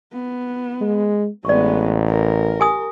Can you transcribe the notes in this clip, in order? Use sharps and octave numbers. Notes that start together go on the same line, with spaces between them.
B3
G#3
A1 G#3 B3 D5 C#6
A#4
G4 G#5 D#6